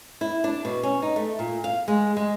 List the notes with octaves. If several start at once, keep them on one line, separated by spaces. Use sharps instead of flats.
E4
D4
B2
C#4
D#4
A3
A#2
F5
G#3
G#3